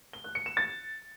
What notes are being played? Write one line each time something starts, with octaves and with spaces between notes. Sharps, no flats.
G7
F#6
C#7
E7
A6